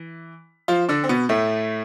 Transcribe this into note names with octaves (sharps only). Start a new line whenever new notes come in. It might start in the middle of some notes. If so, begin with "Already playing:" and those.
Already playing: E3
F3 F4
D3 D4
C4
B2 B3
A2 A3